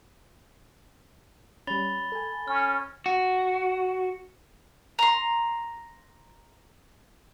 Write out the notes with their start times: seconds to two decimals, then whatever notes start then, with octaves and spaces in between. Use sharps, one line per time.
1.67 G3 C#4 B5 A6 G7
2.12 A4 G#5
2.48 C#4 F6
3.06 F#4
4.99 A#5 C6